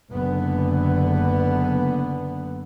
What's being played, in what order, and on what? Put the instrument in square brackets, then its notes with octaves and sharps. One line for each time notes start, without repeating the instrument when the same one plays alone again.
[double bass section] F#1 D3 B3